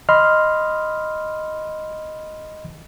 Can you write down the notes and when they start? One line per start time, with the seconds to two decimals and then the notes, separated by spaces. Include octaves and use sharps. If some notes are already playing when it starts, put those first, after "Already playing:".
0.09 D#5 B5 C6 F6